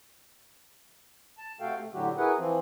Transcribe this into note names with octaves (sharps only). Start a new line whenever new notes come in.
A5
C3 A3 F#4 A4 F5 G5
A3
A2 D3 F#3 F#4 G4
E4 F#4 G#4 A#4 B4 F#5
E3 F3 C4